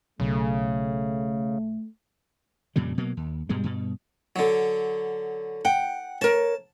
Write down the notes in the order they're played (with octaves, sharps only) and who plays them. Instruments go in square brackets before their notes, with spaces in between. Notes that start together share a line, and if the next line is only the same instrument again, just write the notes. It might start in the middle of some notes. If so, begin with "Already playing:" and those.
[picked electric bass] B1 [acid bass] C#3 [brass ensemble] A3
[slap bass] F2 A#2 C#3 G3
B2 F#3 A#3
D#2
G2 B2 G3 G#3
G2 B2
[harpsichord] D3 F#3
[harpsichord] F#5 [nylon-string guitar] G5
[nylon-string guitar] A#4 C#5 [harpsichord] A5